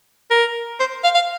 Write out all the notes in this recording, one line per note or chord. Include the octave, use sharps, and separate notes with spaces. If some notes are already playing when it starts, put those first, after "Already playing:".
A#4
C5
F5
F5